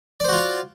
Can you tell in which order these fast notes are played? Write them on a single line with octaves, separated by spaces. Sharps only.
D5 C5 F#4 F4 F5